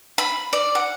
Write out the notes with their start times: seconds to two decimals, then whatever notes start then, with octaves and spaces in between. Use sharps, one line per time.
0.18 B5
0.53 D5
0.75 F#5